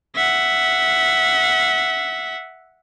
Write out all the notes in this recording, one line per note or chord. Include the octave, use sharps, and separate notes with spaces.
E5 F#5